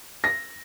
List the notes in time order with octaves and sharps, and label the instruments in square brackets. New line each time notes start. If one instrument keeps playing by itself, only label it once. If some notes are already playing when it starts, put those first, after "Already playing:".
[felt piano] A#6